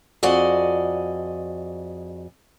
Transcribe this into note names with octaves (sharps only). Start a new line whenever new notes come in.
F2 F#4 G#4 D5 D#5